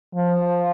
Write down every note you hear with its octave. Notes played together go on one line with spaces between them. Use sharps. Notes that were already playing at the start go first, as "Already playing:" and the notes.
F3